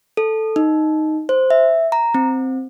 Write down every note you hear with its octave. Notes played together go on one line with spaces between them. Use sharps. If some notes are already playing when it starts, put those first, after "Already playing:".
A4
D#4
C5
E5
A#5
C4